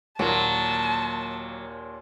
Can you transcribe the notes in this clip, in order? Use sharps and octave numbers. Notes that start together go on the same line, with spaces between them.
D#2 A#2 F#3 A5